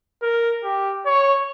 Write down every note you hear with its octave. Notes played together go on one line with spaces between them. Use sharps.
A#4
G4
C#5